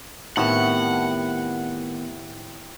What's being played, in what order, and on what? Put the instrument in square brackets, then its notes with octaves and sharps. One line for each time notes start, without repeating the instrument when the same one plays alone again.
[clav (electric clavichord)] A2 [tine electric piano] D#3 B3 [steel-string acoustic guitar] C4 E4 G4 [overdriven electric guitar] F#5